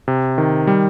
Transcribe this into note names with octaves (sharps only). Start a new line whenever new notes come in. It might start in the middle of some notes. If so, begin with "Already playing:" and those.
C3
D#3
G3